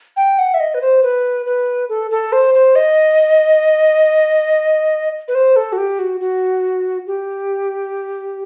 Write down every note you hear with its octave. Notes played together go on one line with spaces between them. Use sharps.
G5
F#5
E5
D#5
B4
C5
B4
B4
A4
A4
C5
C5
D#5
B4
C5
A4
F#4
G4
F#4
F#4
G4